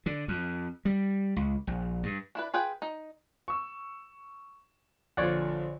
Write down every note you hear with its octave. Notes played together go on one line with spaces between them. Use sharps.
D3
F2
G3
C#2
A#1
G2
D4 E4 B4
F4 G#4 B4 G5
D#4
C#6 E6
A#1 D3 F4 C#5 D5 F#5